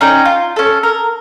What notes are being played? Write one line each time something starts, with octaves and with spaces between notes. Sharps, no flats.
C#4 D#4 D5 G5
F4
C#4 A4
A#4